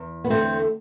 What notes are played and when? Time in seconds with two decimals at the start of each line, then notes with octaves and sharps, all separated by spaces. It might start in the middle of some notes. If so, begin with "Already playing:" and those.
Already playing: E2
0.24 B3
0.30 D3 A3 C4